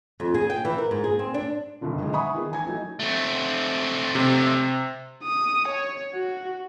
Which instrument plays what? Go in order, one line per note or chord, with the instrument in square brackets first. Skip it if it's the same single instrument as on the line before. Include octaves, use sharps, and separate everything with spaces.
[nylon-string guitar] F2
G#4
G5
E3
A#4
G#2
G#4
C4
D4
[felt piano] F#1 G2 B2 D3 D#3
G#1 D2 G#3 D#5
E5 F#5 G#5 B5 C#6 D#6
D#3 B3 G#4
A1 G#5 G#6
E3 F#3 A3 D#4 F#4
[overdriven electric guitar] A3 C4
[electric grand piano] C3
[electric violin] D#6
C#5
F#4